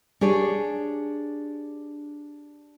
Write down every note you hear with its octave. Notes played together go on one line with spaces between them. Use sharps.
D4 G4 G#4 C#5